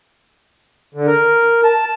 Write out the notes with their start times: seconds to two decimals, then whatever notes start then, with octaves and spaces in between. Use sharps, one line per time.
0.94 D3
1.07 A#4
1.64 A5